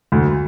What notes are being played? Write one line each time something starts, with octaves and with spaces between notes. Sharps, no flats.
D2